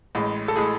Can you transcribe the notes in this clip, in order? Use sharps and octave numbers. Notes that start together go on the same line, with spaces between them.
A1 A2 G#3
A4
A2 G#3 G#4